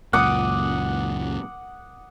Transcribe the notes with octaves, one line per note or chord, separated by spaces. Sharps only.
C#2 F#2 A#2 F#5 D6 D#6